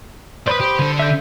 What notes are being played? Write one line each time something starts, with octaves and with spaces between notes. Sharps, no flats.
B4 C5 D5 B5 D#6
G4
D3 A4
E5 G6